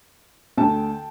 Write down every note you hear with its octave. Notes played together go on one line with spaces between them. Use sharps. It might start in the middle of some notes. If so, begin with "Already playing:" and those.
D2 D3 G5 A5